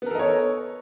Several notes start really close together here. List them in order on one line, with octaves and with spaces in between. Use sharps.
B3 A#4 A4 D#5 C#5